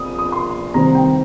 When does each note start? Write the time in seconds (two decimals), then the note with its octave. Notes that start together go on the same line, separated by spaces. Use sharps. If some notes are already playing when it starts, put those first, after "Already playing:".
Already playing: A#1 C4 D#6
0.19 D#6
0.32 C6
0.74 C2 C3 D#3 C4 A#5
0.95 G5